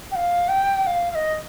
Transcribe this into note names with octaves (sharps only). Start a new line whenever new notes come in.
G5
F5
G5
F5
F5
D#5